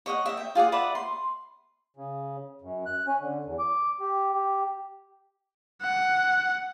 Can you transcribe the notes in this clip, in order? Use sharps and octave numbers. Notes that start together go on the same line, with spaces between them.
C#5 D#5 E5 F#5
D#5 E5
G5
F4 G#4 D5 F#5
B4 D5 E5 F#5
C6
C#3
F#2
F#6
C#4
D3
E2
D6
G4
G4
F#5